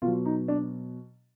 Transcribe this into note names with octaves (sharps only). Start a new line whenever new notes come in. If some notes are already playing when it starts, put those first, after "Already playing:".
B2 F#3 F4
D#4
D4